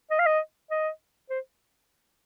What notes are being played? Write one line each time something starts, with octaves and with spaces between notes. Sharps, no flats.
D#5
F5
D#5
D#5
C5